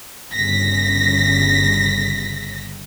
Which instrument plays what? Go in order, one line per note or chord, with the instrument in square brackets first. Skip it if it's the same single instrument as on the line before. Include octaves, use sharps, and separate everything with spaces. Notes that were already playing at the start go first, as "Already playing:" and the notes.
[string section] G1 C#3 A#6 B6